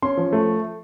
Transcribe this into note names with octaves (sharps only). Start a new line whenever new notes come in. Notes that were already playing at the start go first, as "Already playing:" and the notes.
C#4 C6
F3
A3